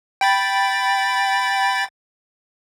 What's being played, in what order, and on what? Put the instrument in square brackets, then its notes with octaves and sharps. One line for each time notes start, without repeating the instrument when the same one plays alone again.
[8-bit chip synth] G5 B5 A6